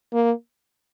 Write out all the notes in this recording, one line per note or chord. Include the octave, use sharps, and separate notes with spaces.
A#3